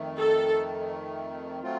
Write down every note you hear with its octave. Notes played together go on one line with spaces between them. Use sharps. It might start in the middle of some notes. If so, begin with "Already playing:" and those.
Already playing: F2 D#3 A3
A4
F#3 A3 C4 F4